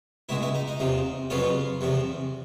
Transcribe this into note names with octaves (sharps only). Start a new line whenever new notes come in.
C#2 B2 G#3 E4
E4
D#4
D#4
E2 C3 F3
F2 C#3 F#3 B3 F4
E2 C3 F3